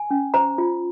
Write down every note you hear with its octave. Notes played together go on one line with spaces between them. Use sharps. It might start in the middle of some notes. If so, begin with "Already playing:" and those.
Already playing: G#5
C#4
C5 A#5
F4